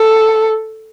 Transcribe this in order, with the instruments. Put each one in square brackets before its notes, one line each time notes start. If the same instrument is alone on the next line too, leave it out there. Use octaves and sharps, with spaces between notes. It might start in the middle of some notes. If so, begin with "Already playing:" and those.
Already playing: [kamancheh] A4